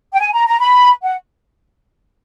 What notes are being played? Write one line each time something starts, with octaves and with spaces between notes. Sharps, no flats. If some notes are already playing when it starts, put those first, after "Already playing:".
G5
G#5
A#5
A#5
B5
F#5